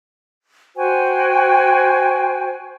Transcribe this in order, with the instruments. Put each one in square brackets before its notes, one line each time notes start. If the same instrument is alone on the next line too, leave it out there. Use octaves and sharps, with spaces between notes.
[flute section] F#4 C5 G5 G#5